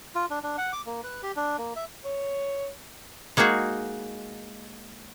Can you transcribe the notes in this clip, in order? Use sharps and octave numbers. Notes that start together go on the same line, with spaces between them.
F4
D4
D4
F#5
D6
A#3
B4
G4
D4
A#3
E5
C#5
G#3 A#3 D#4 F#4 G#4